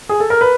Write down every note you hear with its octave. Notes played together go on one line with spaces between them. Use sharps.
G#4
A4
A#4
B4